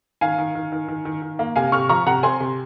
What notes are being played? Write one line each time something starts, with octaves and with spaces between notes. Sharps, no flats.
D#3 F5 G#5
D#3
D#3
D#3
D#3
D#3
D#3
A#3
C3 F5 G#5
C3 C#6 F6
F3 A#5 C#6
C3 F#5 A#5
C4 G#5 C6
C3